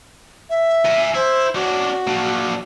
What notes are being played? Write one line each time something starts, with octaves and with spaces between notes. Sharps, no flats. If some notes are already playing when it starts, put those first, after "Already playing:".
E5
A#4 G#5
E4 C5
C#4 D4 F#4
A#3 D4